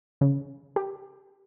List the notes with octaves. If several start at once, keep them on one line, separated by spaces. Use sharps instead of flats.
C#3
G4